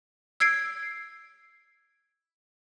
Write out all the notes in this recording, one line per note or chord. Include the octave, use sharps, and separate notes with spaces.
E6 G#6 C7 D7